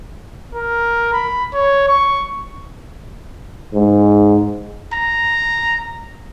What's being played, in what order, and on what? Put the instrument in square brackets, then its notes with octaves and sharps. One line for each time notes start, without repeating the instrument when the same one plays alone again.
[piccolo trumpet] A#4
B5
C#5
C#6
[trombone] G#2
[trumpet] A#5